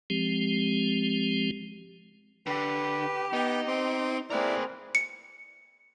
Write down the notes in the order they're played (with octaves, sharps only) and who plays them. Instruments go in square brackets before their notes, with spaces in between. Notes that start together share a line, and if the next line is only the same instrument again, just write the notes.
[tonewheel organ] F3 G#3 C4 G4
[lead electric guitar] D3 [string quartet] G4 [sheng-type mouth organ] B4
[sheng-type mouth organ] B3 G5 [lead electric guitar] D#4
[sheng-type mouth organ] C4 C6 D6
[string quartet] A#3 C4 G#4 [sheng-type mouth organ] E4 D5 [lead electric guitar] A#4 B4
[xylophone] C#7